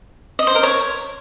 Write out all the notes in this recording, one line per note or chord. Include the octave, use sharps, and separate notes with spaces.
D#5
C5
A#4
C#5